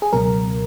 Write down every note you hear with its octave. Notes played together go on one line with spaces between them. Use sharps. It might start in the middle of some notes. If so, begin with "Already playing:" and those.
G#4
C#2 B2 F#3 A#4